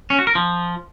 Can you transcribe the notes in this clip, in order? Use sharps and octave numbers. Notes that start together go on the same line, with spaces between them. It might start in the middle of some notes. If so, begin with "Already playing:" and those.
C#4
F#4
A#4
F3